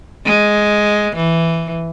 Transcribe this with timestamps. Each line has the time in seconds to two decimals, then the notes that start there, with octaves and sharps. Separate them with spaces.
0.25 G#3
1.16 E3